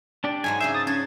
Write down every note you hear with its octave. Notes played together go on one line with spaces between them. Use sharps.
D4 G4 D5
G#2 F#3 G#3 G#5
C#3 D4 C5 E5 C7
D#6 A6
C#4 D4 G#6